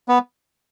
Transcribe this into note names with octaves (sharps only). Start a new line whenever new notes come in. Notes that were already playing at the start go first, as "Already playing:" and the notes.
B3